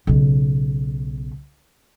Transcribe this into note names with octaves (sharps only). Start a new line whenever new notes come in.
B1 C#3